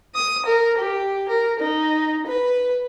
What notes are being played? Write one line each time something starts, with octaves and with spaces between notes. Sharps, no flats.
D#6
A#4
G4
A#4
D#4
B4